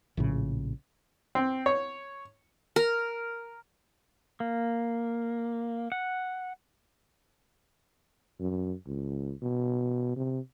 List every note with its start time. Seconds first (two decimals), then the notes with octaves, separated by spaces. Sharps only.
0.17 A#1 A2 C#3
1.35 C4
1.66 C#5
2.76 A#4
4.40 A#3
5.92 F#5
8.39 F#2
8.87 C#2
9.42 B2
10.16 C3